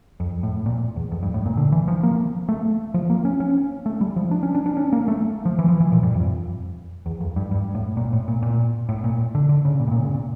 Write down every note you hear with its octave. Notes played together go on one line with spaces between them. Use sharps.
F2
A2
A#2
E2
F2
G2
A2
A#2
D3
E3
F3
A#3
A3
F3
A#3
C#4
C#4
A3
G3
F3
D4
C#4
D4
D4
C#4
A#3
A3
F3
E3
F3
E3
A#2
G2
F2
E2
F2
G2
G2
A2
A#2
A2
A#2
A#2
A2
A#2
D3
D3
C#3
A#2
A2
A#2
C#3
A#2